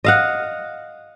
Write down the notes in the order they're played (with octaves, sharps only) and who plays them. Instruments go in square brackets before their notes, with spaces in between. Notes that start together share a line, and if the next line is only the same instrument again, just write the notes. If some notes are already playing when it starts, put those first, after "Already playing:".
[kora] D#5 F5 F#5